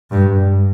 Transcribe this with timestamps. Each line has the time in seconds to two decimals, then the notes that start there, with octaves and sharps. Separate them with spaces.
0.11 G2